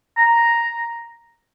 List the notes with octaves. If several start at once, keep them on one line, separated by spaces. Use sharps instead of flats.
A#5